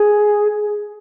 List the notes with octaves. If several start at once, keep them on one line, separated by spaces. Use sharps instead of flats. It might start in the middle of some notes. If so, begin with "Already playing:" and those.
Already playing: G#4